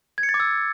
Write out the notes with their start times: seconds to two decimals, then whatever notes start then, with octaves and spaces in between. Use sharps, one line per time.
0.18 G#6
0.23 C#7
0.29 A6
0.34 D6
0.40 E6